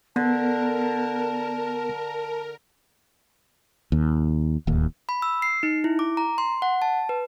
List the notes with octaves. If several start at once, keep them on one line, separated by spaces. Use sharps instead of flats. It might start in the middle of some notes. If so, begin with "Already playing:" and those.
D3 B3 A#4 A5
D#2
D1 D#2
B5
E6
C7
D#4
E4
D6
A#5
C6
F#5
A5
B4